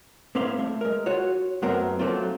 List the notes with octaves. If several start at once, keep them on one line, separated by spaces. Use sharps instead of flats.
A2 A#3 C4 E5 F5 C6
A3
G#3 A#4
F4 F#4 C#5
F#2 F#3 A3 B3 C4 A#4
F#3 A3 A#3 C4 F4